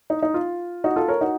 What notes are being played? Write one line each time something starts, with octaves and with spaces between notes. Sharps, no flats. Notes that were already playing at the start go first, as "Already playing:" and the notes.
D#4
D#4
F4
D#4 F#4
F4 A4
A#4 C#5
D#4 F#4